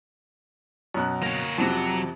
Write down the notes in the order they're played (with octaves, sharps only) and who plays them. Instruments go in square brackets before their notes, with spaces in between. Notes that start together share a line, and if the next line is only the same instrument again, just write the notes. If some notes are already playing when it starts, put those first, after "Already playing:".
[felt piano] F#2 B2 F#6
[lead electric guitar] A#3 C#5
[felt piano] F2 C3 [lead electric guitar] F#3